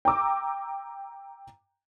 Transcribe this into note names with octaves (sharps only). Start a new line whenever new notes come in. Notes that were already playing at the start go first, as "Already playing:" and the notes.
G5 A#5 D6 E6